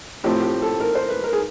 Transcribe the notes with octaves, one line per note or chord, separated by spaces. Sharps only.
A2 F3 A3 C4 G4
G4
A4
A#4
C5
B4
A#4
G#4